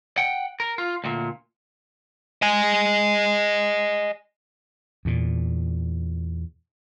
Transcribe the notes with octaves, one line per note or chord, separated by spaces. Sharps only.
F#5 G5
A#4
F4
D2 A#2
D#5 G#5
E2 A#2